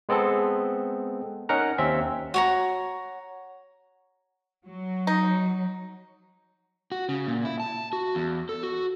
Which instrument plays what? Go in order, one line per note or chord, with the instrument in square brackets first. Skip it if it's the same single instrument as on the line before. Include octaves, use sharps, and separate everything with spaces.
[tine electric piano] G#3 B3 C4 G#4 A4
C#4 D#4 A#4 F#5 A#5
D#2 C4 C#4 E5
[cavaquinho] F#4 C#5 A#5
[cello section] F#3
[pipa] D#4
[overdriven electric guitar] F#4
C#3
A#2
E4
A5
F#4
E2
A4
F#4